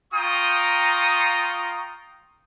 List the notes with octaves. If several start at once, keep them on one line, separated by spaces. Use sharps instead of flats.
F4 G5 A#5 C#6 D#6